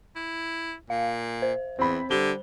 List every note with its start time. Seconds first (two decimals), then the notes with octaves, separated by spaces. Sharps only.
0.16 E4
0.90 A#2 F5
1.42 C5
1.79 E2 C4 B5
2.10 D3 G3 G7